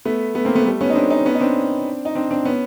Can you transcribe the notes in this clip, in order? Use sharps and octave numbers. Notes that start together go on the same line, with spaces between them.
A3 B3
A3 B3
A#3 C4
A3 B3
G3 A3
B3 C#4
D#4
C4 D4
C#4 D#4
B3 C#4
D#4
C4 D4
D#4
C4 D4
C4 D4
B3 C#4